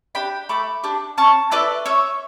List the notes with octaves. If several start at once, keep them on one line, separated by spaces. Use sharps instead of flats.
D4 G4 G5 B5
A3 B5 D6
D4 G4
C#4 A5 C#6
E4 A4 B4 D5
C#4 C#5 E5